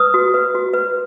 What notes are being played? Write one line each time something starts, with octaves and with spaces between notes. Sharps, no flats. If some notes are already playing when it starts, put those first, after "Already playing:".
Already playing: B4 D#6
F#4
B4
F#4
B4